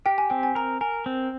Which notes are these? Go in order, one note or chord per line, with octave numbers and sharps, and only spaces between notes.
G4 G5
G#5
C4 G5
G#5
A#4 A#5
A#4 G#5
C4